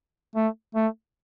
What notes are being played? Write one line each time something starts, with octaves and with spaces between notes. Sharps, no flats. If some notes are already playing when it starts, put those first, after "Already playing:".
A3
A3